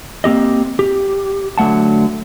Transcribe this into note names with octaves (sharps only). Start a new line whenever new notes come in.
A#3 C4 G4 D#5
G4
D3 F#3 A3 F#5 A5